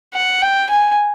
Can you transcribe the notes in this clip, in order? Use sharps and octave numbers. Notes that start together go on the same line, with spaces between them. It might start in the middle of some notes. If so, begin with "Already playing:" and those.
F#5
G5
G#5